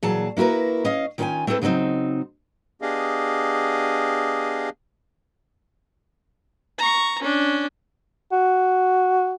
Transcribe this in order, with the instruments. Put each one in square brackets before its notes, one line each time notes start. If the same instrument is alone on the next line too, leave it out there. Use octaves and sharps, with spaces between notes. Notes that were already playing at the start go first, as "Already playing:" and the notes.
[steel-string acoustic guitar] A#2 E3 F#3 G#4 A5
A#3 E4 F#4 A#4 B4
C#4 D#5 F5
D#3 C#4 F4 C5 G5 G#5
A3 C4 E4 A4 B4
C#3 F#3 G3 C4 D#4
[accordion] B3 D4 G4 G#4 D#5 F5
[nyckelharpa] A#5 C#6
C#4 D4
[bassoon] F#4